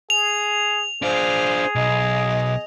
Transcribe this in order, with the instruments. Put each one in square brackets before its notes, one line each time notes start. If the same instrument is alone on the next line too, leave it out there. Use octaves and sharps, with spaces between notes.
[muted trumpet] G#4 [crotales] F7
[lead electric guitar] D4 F4 [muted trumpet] G#4 [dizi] C5
[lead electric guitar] B1 [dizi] D#5